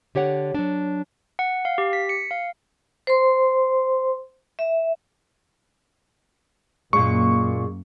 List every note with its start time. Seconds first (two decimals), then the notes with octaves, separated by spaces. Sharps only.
0.15 D3 G4 C#5 F#5
0.54 F#3 D4
1.39 F#5
1.65 F5
1.78 G4
1.93 B6
2.09 C#7
2.31 F5
3.07 C5 C6
4.59 E5
6.93 F#2 A#2 G#3 A#3 C#6